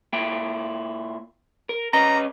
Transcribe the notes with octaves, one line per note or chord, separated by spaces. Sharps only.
A#2 E4 G5
A#4
C#4 B4 D#5 A#5